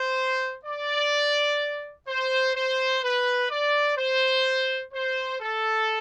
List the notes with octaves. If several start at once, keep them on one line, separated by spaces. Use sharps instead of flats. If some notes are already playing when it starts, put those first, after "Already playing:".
Already playing: C5
D5
C5
C5
B4
D5
C5
C5
A4